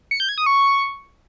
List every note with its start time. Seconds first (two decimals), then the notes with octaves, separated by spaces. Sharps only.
0.11 C#7
0.20 G6
0.29 G#6
0.38 D#6
0.46 C#6